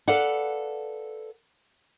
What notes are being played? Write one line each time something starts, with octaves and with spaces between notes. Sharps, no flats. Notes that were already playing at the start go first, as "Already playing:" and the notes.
A4 B4 D5 F5 F#5